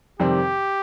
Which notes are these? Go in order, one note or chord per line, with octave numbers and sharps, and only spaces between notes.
F2 C3 D#3 G3 C4 G4